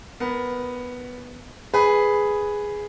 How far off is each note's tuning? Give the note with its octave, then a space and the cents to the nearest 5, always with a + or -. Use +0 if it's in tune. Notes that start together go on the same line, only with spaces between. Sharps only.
B3 +0 A#4 +15
G#4 +0 B4 +0